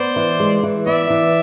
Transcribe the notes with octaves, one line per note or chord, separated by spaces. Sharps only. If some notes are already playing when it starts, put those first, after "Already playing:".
Already playing: B3 C5 D5
E3
G#3
E3
B3 D5 E5
E3